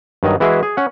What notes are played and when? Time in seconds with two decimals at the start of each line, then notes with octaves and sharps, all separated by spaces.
0.23 G2 D#3 F#3 D#5
0.40 E3 G#3 E4 F#4 G#4 E5
0.63 G#4
0.77 C#4 F#5